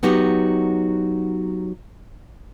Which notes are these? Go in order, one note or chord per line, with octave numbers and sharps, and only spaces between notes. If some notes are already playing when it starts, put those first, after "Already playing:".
F#3 B3 D#4 F#4 G4